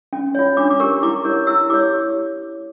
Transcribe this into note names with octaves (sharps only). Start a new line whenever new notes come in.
C#4
F4 C#5
D4 D6
D6
G4 A#4 C#6
E4 D6
A#4 C#5
E4 E6
G4 C#5 D6